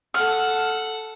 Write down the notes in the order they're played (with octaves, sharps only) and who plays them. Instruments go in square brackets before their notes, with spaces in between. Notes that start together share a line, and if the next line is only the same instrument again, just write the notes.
[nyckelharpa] A4 F#5 [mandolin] F6